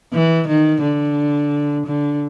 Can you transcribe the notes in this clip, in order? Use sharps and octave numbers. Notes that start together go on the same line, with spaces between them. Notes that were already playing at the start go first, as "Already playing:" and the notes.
E3
D#3
D3
D3